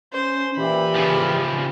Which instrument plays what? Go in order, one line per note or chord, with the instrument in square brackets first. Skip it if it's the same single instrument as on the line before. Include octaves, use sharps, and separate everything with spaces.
[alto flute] C#4 [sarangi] C5
[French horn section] A#2 E3 [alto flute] G4 [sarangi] B5
[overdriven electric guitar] C#3 F3